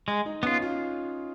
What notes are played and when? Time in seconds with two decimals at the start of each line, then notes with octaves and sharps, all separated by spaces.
0.08 G#3
0.26 D#4
0.43 B3 C#4 F4
0.62 F4